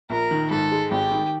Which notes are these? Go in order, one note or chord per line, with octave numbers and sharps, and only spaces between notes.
A#1 A#4
D#3
G#2 A4
G#3
G#1 G4
D#3